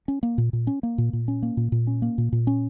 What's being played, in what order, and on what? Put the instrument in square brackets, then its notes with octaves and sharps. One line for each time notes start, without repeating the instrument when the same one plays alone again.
[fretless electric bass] C#4
A#3
A#2
A#2
C#4
A#3
A#2
A#2
C#4
A#3
A#2
A#2
C#4
A#3
A#2
A#2
C#4